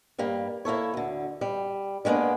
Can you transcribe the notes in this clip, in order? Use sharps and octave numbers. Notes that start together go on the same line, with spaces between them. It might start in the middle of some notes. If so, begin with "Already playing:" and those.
G2 G3 A#3
A#3 E4 A4 C#5
D2 D3
G3
G3 G#3 A#3 B3 D4